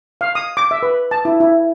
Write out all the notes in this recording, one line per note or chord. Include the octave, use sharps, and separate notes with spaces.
F5
D#6
D6
E5
B4
A5
E4
E4